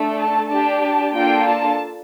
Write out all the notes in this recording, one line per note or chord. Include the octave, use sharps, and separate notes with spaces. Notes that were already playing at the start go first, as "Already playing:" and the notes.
Already playing: A3 D4 A4
A5
D4 G4 A5
A5
A#3 D4 F4 A4 G5
A5